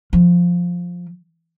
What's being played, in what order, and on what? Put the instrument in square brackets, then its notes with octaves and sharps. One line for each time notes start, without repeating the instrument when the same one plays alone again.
[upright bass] F3